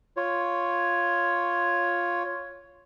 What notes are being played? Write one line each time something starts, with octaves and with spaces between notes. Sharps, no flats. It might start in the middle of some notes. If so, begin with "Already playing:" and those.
F4 C#5